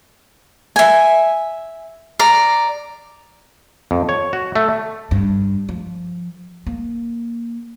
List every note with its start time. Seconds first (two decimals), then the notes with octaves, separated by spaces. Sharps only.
0.76 E5 G#5
2.19 D5 A#5
3.91 F2
4.09 C#5
4.33 F#4
4.56 A3
5.11 G2
5.69 F3
6.67 A#3